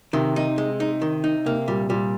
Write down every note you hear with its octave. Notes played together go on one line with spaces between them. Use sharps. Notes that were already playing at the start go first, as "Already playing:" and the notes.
C3 D#3
D#4
G#3
D#4
D#3
D#4
C3 A#3
A#2 G3
A#2 G3